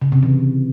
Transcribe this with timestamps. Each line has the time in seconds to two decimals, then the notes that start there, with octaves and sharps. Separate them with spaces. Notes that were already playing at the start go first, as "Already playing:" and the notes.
0.02 C#3
0.12 C3
0.23 E3